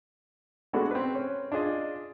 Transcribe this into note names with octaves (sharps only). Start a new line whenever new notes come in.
G#3 A3 B3 D4 F#4 A4
C4 B4
C#4
D4 F4 G#4 D#5